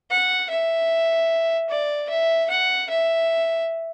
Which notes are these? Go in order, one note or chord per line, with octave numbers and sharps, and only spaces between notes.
F#5
E5
D5
E5
F#5
E5